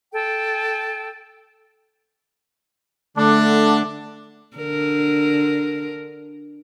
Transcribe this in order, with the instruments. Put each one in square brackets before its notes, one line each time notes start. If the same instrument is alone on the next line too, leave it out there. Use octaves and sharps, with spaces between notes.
[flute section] A4 G5
[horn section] D3 [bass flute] A3 [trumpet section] D4
[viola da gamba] D3 D4 A#4